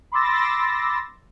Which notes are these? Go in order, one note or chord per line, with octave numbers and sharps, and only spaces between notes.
B5 C6 D6 E6 A6 A#6